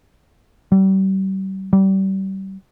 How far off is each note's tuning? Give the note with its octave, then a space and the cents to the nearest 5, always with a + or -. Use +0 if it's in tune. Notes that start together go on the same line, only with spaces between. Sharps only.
G3 -40
G3 -30